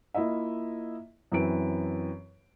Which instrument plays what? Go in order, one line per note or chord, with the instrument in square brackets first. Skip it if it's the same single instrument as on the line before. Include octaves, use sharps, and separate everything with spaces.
[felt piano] A#3 E4 F4 D#5 E5
F#2 E3 C4 E4 B4 D7